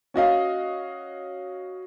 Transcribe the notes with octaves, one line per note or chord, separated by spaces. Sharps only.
C#4 F#4 D#5 F5